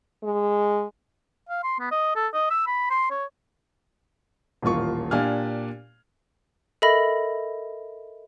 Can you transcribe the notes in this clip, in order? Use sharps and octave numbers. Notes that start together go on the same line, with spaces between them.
G#3
F5
C6
B3
D#5
A4
D#5
E6
B5
C6
C#5
D#1 A1 A#3 F4 C#6
A#2 D4 G4 F5 G#5 F6
A4 A#4 D#5 E5 B5 A#6